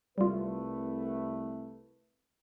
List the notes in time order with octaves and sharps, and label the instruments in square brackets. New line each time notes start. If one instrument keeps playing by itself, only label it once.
[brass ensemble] C2 A3 B4 [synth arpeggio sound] G3 F4